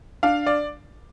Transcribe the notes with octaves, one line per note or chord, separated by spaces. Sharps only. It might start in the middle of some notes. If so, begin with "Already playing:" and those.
D4 F5
D5